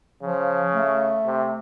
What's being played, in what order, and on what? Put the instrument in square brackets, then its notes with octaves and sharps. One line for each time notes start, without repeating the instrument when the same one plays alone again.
[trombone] C#3 [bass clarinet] F3
[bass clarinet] A3
[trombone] C3